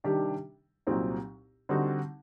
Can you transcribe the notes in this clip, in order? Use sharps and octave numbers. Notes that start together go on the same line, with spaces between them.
C3 D#3 G3 D4 G4
C2 A#2 F#3 C4 D#4
D3 G3 C4 D#4 F#4